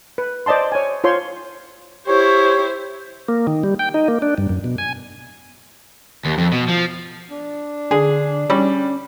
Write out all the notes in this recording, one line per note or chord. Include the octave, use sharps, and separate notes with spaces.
B4
C5 D5 D#5 A5 C6
C#5 G#5
F4 C5 C#5 C6
E4 G4 C5 C#5
A#3
D#3
G3
G5
D#4
A#3
D4
G2
F#2
B2
G#5
D#2
F2
B2
F3
D4
D3 G#4
G3 C#4